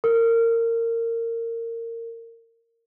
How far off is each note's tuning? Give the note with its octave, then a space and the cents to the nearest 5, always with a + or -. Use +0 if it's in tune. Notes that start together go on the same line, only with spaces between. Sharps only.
A#4 -25